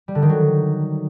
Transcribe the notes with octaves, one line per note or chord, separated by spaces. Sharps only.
G3
D3
D#3
F#3